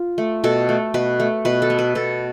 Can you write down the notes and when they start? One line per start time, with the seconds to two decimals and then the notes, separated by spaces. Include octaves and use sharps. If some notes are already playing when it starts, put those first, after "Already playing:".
Already playing: F4
0.18 A3
0.44 B2 A4
0.69 A3
0.94 B2 B4
1.20 A3
1.45 B2 B4
1.62 A4
1.70 B3
1.79 B4
1.95 B2 A4